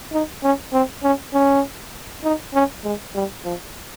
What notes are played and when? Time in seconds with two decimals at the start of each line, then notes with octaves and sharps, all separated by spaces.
0.12 D#4
0.43 C#4
0.73 C4
1.03 C#4
1.34 C#4
2.24 D#4
2.54 C#4
2.84 G#3
3.14 G3
3.45 F3